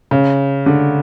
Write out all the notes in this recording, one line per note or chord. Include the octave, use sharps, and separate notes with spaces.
C#3
D3